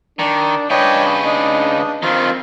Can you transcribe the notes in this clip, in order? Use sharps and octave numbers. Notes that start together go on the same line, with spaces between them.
D#3 D4
C#3 D4 B4 C#5 D#5 G5
D4 D#4
F2 D#3 C4 F4